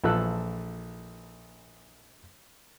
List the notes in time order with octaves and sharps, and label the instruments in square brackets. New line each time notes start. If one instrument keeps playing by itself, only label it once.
[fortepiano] A#1 E3 F4 A4 E6 F#6